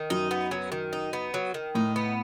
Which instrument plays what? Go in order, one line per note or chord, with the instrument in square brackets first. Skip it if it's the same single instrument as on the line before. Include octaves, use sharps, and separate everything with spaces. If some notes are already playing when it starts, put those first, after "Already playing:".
Already playing: [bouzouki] D#3
[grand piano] F#2 [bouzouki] D#4
[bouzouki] B3
F#3
D#3
D#4
B3
F#3
D#3
[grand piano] A2 [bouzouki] D#4
[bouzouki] B3